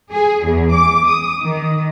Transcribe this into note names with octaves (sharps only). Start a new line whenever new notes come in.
G#4
E2
D6
D#6
D#3